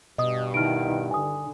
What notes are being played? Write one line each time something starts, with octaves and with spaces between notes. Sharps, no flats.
G2 B2 D#5 D#6
D#3 E4 F6 D7
D3 G#5 D#6